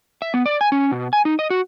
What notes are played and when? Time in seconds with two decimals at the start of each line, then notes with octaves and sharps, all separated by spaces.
0.22 E5
0.34 B3
0.46 D5
0.61 G#5
0.72 C#4
0.92 B2
1.13 G#5
1.25 D#4
1.39 D#5
1.50 F#4